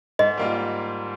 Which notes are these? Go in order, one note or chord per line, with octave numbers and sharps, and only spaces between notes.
G#2 D#5
G3 A#3 F4